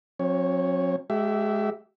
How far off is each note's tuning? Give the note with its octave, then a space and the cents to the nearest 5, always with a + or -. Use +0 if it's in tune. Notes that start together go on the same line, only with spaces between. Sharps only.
F#3 -45 C4 +35 C#5 +0
G#3 +20 G4 -30 E5 +10